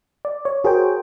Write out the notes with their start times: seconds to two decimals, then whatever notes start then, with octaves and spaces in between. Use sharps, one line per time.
0.25 D5
0.45 C#5
0.64 F#4 G#4 A#4 C5 C#5 G5